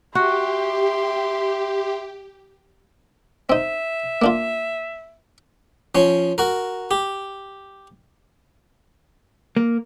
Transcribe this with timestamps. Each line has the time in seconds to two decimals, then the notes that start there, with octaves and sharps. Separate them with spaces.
0.15 F#4 G4 E5 C6
3.50 C4 D#4 E5
4.22 A#3 D4 F4
5.95 F3 C#4
6.38 F#4 A#4
6.91 G4
9.56 A#3